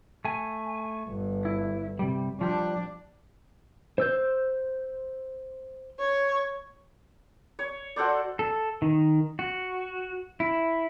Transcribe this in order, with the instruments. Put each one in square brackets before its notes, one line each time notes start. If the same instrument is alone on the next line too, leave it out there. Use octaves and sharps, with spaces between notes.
[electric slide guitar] A3 G#5
[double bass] G1
[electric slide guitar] E4
C3 G3
[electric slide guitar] F3 G3 [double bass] D4
[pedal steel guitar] C5 E6 G6
[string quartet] C#5
[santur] C#5
F#4 A4 C5 D5
[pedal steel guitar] A4
D#3
F#4
E4